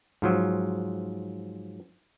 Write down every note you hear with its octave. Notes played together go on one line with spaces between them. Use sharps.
G#2 F3 F#3